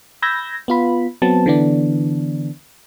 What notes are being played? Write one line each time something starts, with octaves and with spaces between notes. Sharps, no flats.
B5 E6 G6 G#6 A#6
B3 F4 B5
F#3 B3 C4 A5
D3 E3 B3 D4